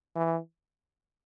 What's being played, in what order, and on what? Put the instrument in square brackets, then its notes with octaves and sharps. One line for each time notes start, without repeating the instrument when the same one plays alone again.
[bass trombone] E3